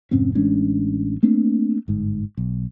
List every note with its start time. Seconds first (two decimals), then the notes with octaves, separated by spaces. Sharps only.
0.11 F1 G#2 C4 C#4
0.35 A1 G#3 C#4 D4
1.23 A3 A#3 C4 D4
1.88 G1 G#2
2.37 B1